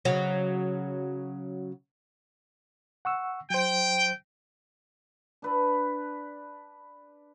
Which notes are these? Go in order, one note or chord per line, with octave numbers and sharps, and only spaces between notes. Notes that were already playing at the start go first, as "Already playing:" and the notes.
C#3 F#3
F#5 C#6 E6
F#3 C5 G5
D4 B4 D5